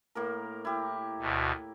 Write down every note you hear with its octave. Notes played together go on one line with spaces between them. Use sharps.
A2 A#3 A#4
E4 G4
D2 B2